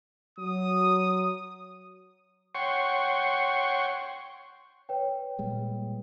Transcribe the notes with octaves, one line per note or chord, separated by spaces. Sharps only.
F#3 D#6
C#5 F#5 G5 C6 C#6
B4 C#5 G5
A#2 G3 G#3